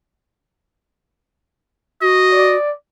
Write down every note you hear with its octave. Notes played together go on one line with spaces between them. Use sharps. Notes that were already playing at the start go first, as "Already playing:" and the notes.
F#4 D#5
D5